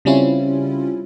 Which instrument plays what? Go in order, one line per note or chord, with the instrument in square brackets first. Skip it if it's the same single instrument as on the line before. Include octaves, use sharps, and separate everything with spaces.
[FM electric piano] C#3 G3 C4 C#4 E4 F4